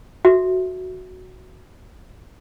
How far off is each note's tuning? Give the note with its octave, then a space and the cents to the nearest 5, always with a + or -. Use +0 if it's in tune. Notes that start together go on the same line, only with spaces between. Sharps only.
F#4 +0 A4 -10 E5 +0